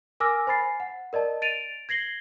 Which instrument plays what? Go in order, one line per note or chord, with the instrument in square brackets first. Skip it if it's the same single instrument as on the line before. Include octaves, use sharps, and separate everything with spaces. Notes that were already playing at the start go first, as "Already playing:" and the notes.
[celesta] A#4 G#5 D6 E6 F6 A#6
C5 G#5 B5 A6 C7
F#5
A#4 D5 D#5 A5
A6 D7 D#7 F7
G#6 A#6 C7 F#7 G7